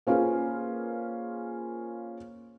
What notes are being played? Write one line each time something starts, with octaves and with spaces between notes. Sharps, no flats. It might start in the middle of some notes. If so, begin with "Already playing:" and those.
A#3 C#4 F4 G#4 B4 C5